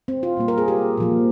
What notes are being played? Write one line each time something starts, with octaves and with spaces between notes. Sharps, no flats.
C4
F4
A#2 G3 A#3
A#4
G#4
G4
A#2 F3 A#3